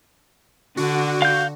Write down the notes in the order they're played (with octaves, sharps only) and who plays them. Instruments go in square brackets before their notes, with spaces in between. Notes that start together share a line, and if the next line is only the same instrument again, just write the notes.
[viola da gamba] D3 D4 [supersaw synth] F#4
[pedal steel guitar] F5 G6